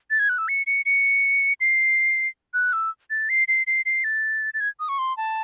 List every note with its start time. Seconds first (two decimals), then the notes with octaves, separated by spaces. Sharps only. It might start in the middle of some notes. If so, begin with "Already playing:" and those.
0.11 A6
0.19 G#6
0.29 F#6
0.38 E6
0.48 C#7
0.67 C#7
0.86 C#7
1.61 C7
2.54 F#6
2.73 E6
3.10 A6
3.29 C7
3.48 C7
3.67 C7
3.86 C7
4.04 A6
4.54 A6
4.60 G#6
4.80 D#6
4.89 C#6
4.99 C6
5.17 A5